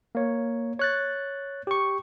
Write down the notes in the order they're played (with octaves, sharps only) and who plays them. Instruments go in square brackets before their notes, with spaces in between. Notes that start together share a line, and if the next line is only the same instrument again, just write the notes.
[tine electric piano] A#3 C#5
C#5 F#6 A6
G4 C#6